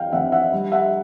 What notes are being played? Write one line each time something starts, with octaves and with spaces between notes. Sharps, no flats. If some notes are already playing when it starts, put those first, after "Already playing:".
Already playing: F2 E3 F5 G5
F2 E5 F#5
E5 F#5
G3
E5 F#5